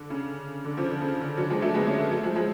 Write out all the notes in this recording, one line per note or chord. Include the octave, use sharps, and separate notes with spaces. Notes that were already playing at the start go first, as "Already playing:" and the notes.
Already playing: D3
C#3
D3
C#3 F3
D3
C#3
D3
D3 F#3
F3 G#3
F#3 A3
G#3 B3
A3 C#4
A3 C#4
F#3 A3
F3 G#3
F3 G#3